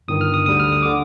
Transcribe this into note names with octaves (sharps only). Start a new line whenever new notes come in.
G1 G2 D#3 D#6
F6
D#6
D2 D3 G3 D#6
F6
D#6
D3 D6